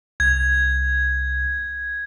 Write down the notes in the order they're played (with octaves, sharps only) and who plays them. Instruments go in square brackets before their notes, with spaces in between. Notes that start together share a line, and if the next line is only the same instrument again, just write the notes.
[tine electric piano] C2 [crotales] G#6